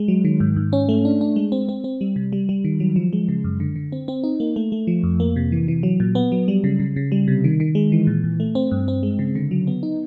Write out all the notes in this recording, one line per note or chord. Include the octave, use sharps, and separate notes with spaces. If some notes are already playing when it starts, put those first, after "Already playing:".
Already playing: G#3
F#3
D#3
G#2
G#2
C#4
A3
D4
D4
G#3
C4
C4
C4
G3
C3
G3
G3
D#3
F#3
F3
G#3
C#3
F#2
D3
D3
C4
C4
D#4
A#3
A3
A3
F3
F2
A#3
C3
E3
E3
F#3
A#2
B3
F#3
G3
C#3
C#3
C#3
G3
C3
D#3
D#3
G#3
E3
A#2
A#2
A3
C4
G2
C4
G#3
C#3
D3
F#3
B3
D#4